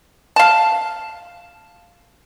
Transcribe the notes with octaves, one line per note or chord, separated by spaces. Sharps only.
F5 A5